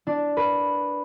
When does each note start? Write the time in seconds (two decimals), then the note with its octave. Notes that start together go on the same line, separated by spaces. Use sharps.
0.07 D4
0.37 B4